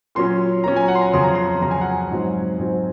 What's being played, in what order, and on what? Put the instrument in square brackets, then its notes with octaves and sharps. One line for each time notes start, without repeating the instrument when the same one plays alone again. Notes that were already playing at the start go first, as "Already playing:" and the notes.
[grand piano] A#2 F#3 C#4 C6
A#2 F#3 C#4 A#5
G#5
F#5
C6
A#5
F2 C#3 F#3 C#4 C6
A#5
C6
F2 C#3 F#3 C#4 A#5
G#5
F#5
G#5
G#2 F#3 C4
G#2 F#3 C4